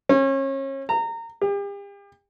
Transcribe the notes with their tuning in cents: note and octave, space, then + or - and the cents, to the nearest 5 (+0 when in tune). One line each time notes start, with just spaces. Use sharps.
C#4 -35
A#5 -25
G4 +40